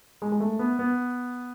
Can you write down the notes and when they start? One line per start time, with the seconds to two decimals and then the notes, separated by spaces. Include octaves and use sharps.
0.22 G#3
0.32 G#3
0.40 A3
0.59 B3
0.79 B3